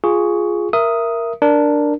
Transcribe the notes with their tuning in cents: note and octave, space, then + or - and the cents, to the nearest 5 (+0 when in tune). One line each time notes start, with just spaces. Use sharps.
F4 +0 G#4 +0 C#6 +15
A#4 +0 E5 +20 D#6 +5
D4 +0 A#4 +0